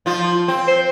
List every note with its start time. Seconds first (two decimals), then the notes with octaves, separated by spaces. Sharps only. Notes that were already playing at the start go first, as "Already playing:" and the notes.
0.06 F3 F4
0.48 C4
0.68 C5